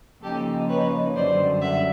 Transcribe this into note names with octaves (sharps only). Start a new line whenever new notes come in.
C#3 F3 A#3 D#4 G4 A4
B4 C#5
F#2 D3 G3 C5 D5
E5 F#5